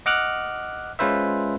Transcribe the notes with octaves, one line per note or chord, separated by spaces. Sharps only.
D#5 F#5 D6 F6 F#6
G#3 C#4 F4 B4 C5 E5